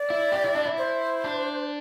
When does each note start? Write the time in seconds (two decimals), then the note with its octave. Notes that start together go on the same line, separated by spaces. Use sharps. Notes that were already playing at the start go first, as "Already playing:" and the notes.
Already playing: D5
0.10 E4
0.32 G4
0.44 E4
0.55 D4
0.66 E4
0.78 C5
1.24 D4